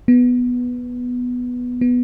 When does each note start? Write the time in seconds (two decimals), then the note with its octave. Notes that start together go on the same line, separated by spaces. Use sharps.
0.08 B3
1.81 B3